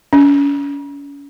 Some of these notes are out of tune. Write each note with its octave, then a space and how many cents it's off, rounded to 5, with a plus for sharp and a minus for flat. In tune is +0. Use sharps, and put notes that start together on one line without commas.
C#4 +35